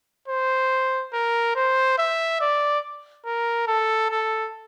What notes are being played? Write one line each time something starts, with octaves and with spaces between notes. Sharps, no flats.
C5
A#4
C5
E5
D5
A#4
A4
A4